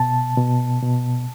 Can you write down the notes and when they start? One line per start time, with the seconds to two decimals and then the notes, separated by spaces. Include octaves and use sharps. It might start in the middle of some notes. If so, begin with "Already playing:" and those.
Already playing: B2 A5
0.37 B2
0.83 B2